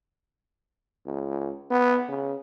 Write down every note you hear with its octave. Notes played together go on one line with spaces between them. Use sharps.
C#2
B3
C#3